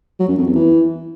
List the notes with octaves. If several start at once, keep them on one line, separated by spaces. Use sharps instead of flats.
F#3
F#2
F2
E2
E3